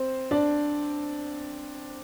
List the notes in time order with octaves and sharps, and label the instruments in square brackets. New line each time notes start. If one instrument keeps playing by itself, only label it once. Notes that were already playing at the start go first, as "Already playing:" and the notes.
Already playing: [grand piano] C4 C5
D4 D5